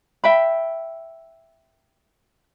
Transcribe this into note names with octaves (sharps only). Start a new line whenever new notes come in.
E5 G5 B5